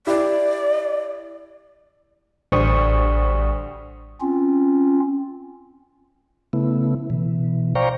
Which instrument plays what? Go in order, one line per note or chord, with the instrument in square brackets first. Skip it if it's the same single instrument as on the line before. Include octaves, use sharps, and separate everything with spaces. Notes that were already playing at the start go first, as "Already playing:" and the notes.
[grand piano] E4 G4 [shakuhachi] D5
[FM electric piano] A1 C#6 D#6 [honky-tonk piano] D2 G3 C5
[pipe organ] C4 C#4 F4
[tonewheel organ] C#3 A3 B3 E4
B2 E3
C5 D5 F5 G5 A#5 C#6